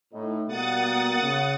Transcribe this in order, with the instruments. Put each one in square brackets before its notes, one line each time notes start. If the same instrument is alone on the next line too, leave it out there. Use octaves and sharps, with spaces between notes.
[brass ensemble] A2 D#4
[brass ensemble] B2 G3 A#3 [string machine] F#5 D#6 A6
[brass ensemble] C#3